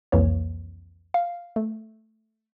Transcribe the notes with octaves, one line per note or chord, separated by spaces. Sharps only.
C2 F2 E3 A#3 C#5
F5
A3